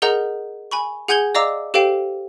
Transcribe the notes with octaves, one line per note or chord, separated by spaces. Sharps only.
G#4 A#4 D#5 F#5 A#5 G6
G#5 B5 C#6
G#4 F#5 G#5 G6 G#6 G7
D5 D#5 F5 A#5 D6 E6
G4 A4 C5 F5 G5 D7